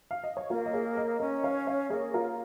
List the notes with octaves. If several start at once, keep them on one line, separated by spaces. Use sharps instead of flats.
F5
D#5
C#5
A#3 F4 A#4
D#5
G#4 C#5
A#4 D#5
C#4 A#4 D#5
C#5 F5
C#5 F5
A#3 G#4 C#5
F4 A#4